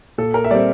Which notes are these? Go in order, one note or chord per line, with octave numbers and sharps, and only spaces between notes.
A#2 A4
A#4
E5
G3 C4 D5